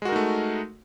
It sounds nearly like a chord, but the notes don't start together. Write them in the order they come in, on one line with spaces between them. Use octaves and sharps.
G#3 F#4 A#4 D#4 A3